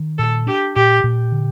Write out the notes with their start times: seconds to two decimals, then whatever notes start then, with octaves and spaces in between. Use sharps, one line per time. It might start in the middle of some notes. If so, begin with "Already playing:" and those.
Already playing: D#3
0.18 A#2 A4
0.47 D4 G4
0.76 A#2 G4
1.04 A#2
1.32 D3